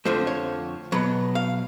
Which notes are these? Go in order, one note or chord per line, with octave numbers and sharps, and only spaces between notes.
F2 D3 F3 A3 C5
C#5
B2 F#3 B3
F5